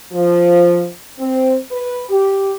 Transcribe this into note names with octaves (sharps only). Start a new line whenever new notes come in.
F3
C4
B4
G4